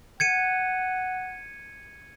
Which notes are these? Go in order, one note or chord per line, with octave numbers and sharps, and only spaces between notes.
F#5 G#6 C#7 D#7